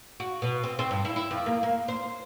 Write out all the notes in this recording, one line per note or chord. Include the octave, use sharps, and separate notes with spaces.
F#4
B2
C4
C4
G2
E4
E4
F2
A#3
A#3
C5